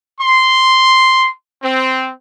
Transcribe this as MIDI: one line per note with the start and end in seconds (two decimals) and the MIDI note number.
0.20 1.30 84
1.63 2.10 60